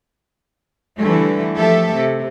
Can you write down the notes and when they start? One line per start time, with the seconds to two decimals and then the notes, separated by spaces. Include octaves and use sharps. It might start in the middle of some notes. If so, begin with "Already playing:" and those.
0.98 D3 E3 G3 A3
1.57 F3 A3 G4 A4 E5
1.94 C3